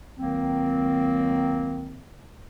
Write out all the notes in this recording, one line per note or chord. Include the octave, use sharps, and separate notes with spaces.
C#2 D#3 F#3 A#3 C4